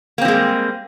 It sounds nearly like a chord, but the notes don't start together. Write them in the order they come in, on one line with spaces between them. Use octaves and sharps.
A#3 C4 F3 G#3 G3